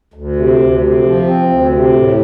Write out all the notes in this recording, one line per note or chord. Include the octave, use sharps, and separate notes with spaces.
D2
C3
D2
C3
F3
C4
D2
C3
A2